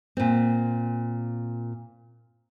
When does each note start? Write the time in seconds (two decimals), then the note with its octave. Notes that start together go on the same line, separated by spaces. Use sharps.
0.17 A#2 C4